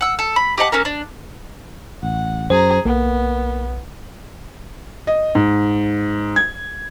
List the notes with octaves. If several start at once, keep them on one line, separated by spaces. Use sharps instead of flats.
F#5 E6
A4
B5
G4 D#5 F#5 A5
A#3 C#4 A4 A#4
D4
A1 F#5
F#2 G#4 C5 A#5
B1 A#3 B3
D#5
G#2
G#6